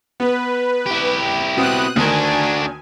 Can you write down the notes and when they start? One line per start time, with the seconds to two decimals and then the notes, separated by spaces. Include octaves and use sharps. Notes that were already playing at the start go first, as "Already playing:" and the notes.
0.20 B3 B4
0.86 E4 G4
1.57 B2 B3 C4 D#6 F#6
1.96 D2 D#3 D4 F#4 G#5